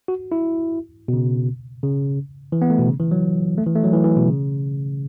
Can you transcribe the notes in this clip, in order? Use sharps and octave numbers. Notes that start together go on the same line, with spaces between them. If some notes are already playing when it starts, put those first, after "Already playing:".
F#4
E4
B2
C#3
C#3
E3
B3
A3
B2
C#3
E3
F#3
A3
E3
A3
F#3
E3
E3
B2
C#3